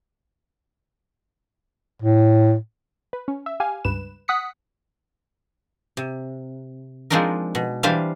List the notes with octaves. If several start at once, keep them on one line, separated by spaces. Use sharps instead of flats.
A2
B4
C#4
E5
G4 F5 G#5
C#2 G2 B4 E7
F#5 D#6 B6 C#7
C3
F3 G#3 C4 D4 D#4 A#4
B2
E3 G3 D4 C5 F5